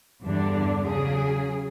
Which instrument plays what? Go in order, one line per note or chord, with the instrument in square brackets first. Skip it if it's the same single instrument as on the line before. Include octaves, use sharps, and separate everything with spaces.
[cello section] E2 G2 D3 D4
C#3 F#3 G#4